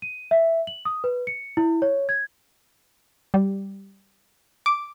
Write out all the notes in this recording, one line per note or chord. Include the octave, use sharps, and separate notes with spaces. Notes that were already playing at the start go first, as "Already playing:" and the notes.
D#7
E5
F#7
D#6
B4
C#7
E4
C#5
G#6
G3
D6